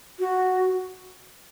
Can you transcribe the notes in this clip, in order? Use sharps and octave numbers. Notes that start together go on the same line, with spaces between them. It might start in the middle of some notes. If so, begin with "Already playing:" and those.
F#4